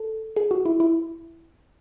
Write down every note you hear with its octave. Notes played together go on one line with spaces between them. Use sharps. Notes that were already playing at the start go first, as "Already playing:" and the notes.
Already playing: A4
G#4
F#4
E4
E4